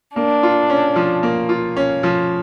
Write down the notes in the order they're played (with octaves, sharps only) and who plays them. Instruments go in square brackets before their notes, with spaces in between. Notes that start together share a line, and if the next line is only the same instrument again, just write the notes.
[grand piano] A#3 [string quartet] D4
[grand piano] F4
C#4
F3
A#3
F4
C#4
F3